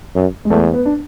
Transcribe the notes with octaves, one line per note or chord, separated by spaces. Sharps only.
F#2
G#3
E2 A3
B3
D4